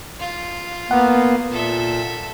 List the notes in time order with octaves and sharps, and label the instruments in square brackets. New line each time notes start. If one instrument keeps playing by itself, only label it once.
[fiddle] F4
[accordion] A#3 B3 [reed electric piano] F#5
[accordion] A#2 [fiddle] A4 E5